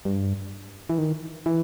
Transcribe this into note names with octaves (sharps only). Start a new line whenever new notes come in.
G2
E3
D#3
E3